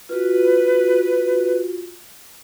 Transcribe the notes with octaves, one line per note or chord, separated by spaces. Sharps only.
F4 F#4 B4